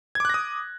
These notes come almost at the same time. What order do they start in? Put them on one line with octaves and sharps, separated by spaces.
G#6 D6 F#6 A#6 D#6